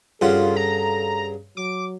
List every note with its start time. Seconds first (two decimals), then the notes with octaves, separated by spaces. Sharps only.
0.21 G2 C#3 F4 A4 F#5
0.56 A#5
1.57 F#3 D6